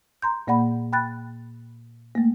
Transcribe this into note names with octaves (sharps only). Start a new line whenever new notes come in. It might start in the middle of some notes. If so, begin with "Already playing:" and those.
A#5 C6 G6
A#2 A#3 D5 F#5 B5
G5 B5 F#6 A6
A3 A#3